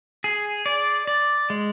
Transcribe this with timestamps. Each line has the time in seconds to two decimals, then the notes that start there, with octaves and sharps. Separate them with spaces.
0.24 G#4
0.66 D5
1.07 D5
1.50 G#3